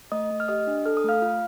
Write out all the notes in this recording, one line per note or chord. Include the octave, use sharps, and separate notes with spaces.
A3 D#5 D#6
A3
F6
G4 D#5 D#6
D4
A4 F6
D#6
A3 F5 F6
F4